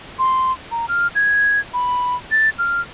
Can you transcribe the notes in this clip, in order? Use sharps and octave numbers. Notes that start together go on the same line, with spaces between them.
C6
A#5
F6
G#6
B5
A6
F6